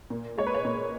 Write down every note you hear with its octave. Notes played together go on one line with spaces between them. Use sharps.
A#2
G#3 C#5
B4
C#5
A#2